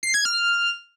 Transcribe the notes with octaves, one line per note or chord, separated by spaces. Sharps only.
C7
G#6
F6